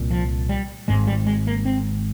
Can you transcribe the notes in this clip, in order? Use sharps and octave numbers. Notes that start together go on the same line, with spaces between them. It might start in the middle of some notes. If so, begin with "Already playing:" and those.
Already playing: C2 A#2
F3
G3
G#1 G#2 G#3
G3
G#3
A#3
C4